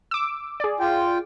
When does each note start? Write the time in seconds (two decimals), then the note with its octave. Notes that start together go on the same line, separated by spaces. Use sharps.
0.11 D6 E6
0.60 G#4 D5
0.80 F4 G5